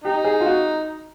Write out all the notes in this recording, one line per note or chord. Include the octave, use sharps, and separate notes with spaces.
D#4 G4
G#4
F4
F#4